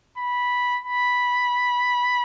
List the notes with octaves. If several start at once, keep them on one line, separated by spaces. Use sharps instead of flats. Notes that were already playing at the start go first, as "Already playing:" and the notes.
B5
B5